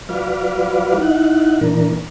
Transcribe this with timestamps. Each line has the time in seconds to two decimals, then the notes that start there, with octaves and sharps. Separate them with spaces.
0.09 F#3 F4 F#4 B4 D5 F5
0.97 D#4 E4 F#5
1.61 A#2 E3 D4 A#4